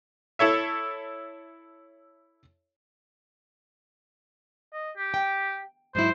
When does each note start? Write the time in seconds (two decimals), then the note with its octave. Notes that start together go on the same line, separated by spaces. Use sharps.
0.39 E4 A4 C#5 E5
4.74 D#5
4.97 G4
5.14 G5
5.95 G#2 F#3 E4 C5